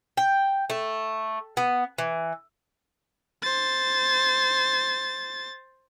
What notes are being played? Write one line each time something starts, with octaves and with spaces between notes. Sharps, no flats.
G5
A3
B3
E3
C5 A6